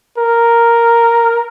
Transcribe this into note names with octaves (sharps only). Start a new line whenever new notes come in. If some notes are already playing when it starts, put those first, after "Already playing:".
A#4